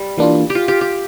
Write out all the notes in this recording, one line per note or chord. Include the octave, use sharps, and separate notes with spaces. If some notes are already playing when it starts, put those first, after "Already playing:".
Already playing: G3
E3 A#3 D4 F4
G4
F4
G4
G4